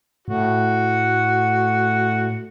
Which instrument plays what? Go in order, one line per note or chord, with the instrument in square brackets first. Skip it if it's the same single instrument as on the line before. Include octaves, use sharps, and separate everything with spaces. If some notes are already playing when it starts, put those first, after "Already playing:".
[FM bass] A2 [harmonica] F#4